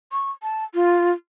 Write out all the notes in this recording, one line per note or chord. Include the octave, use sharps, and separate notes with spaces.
C#6
A5
F4